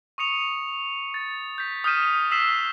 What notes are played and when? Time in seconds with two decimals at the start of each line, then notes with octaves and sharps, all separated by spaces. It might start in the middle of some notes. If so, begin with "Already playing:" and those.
0.18 C#6 D#6 C#7 F7
1.14 A6
1.58 G6 B6
1.84 D#6 F6 G6 B6 D#7 E7
2.31 E6 B6 C7 E7 G7